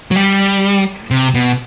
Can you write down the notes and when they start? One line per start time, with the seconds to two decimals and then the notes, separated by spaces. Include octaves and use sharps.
0.11 F#3
0.16 G3
1.11 C3
1.34 B2